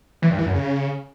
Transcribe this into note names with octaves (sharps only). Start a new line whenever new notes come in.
E3
G2
E3
F#2
C#3